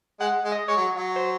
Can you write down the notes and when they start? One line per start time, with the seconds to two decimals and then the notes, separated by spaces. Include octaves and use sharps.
0.20 G#3 F#5
0.45 G#3
0.52 D#5
0.68 G#3 C#5
0.77 F#3
0.94 F#3
1.16 C5